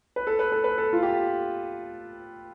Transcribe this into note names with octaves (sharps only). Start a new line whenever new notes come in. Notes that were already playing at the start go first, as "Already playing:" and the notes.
B4
A4
B4
A4
B4
A4
F4
G4